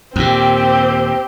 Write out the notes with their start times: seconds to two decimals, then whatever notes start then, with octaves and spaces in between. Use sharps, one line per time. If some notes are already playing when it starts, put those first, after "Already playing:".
0.16 D#2 A#2 C4 G4